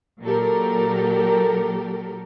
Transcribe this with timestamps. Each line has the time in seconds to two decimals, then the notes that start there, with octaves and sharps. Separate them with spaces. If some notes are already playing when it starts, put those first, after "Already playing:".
0.22 A#2 F#3 G4 A4 A#4